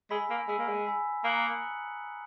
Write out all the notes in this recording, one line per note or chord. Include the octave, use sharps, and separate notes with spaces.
G#3 G#5 B5 E6 B6
A#3
G#3 G#5 B5 E6 B6
A#3
G#3
G#5 B5 E6 B6
A#3 A#5 D#6 F#6 C#7 F#7